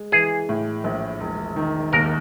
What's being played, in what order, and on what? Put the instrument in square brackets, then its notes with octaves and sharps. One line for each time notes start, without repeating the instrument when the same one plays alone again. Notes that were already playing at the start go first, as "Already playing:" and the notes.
Already playing: [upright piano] G#3
[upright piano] E3 [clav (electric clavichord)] G#4
[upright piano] A2
A#1
E1
D#3
[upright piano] D#2 [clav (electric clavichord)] A#4